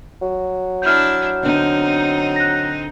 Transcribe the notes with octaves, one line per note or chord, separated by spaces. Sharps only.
F#3
D4 E4 F6 G6
D3 B3 C4 D4 D#4
F#6 A#6